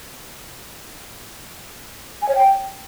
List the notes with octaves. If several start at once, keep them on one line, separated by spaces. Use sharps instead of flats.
G#5
C#5
G5